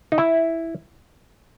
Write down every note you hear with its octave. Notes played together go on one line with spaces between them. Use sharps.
D#4
E4